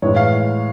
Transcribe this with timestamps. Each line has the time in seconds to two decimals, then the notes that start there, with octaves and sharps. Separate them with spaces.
0.02 A2 E3 G#3 C#5
0.16 F5